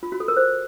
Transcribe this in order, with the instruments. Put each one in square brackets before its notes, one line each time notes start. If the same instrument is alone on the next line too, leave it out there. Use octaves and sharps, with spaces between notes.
[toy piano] F4
F#4
A4
A#4
C5